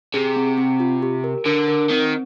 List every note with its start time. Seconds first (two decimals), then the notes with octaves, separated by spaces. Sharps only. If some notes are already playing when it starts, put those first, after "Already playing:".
0.14 C3 G#4
0.36 C4
0.58 C4
0.80 F4
1.02 G4
1.24 A#4
1.46 D3 A#4
1.68 A#4
1.90 D#3 C4